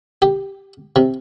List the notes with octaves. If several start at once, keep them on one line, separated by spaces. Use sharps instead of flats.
G4
C3